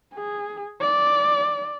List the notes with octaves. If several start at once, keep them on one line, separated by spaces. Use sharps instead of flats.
G#4
D5